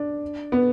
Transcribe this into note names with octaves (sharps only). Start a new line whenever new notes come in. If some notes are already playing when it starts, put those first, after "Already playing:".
Already playing: D4
B3